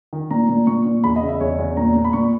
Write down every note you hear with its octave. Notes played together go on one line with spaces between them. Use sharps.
D#3
A#2 A#5
A#2
A#2 C#6
A#2
E2 B5
D#5
C#3
E5
E2 C#5
E2
A#2 A#5
A#2
B5
A#2 C#6